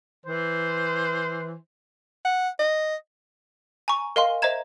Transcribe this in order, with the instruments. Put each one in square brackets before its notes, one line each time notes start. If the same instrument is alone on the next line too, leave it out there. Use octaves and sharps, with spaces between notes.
[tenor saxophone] E3 [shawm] C5
[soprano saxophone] F#5
D#5
[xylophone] G#5 A#5 C#6
A#4 D#5 F5 G#5 C6
C5 D#5 E5 A#5 G#6 E7